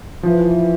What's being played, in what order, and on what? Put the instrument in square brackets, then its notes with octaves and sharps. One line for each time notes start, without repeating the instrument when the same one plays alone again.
[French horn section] E3 [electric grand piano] F3